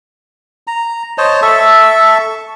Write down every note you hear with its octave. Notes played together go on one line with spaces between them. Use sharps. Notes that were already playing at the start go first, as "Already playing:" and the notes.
A#5
C5 C#5 D#5 A5
A4 E5 A5 C#6